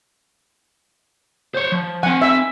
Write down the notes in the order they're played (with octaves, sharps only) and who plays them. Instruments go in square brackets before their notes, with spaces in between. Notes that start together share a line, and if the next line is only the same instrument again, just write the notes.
[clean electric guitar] C5 C#5
F3
[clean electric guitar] C4 G#5 [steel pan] F#5
[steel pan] E5